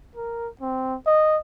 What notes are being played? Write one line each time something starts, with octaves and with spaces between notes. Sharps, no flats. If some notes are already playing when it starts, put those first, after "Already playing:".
A#4
C4
D#5